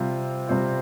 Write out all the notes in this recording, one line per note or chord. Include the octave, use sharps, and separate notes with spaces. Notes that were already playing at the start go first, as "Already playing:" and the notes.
Already playing: C3 G3 C4 F4
C3 G3 C4 F4